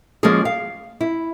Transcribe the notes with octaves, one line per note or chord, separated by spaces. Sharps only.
F3 G#3 A#3 C#4 F#4 G#4
F5
E4